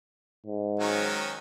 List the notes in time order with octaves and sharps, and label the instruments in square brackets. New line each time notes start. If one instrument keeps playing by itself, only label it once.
[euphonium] G#2
[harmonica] D#3 F#3 C#4